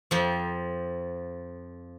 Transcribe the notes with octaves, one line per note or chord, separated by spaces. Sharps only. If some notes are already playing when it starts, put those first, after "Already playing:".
F2 F3